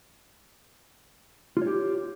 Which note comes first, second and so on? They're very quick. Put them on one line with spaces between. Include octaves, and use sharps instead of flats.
F4 C#5 G4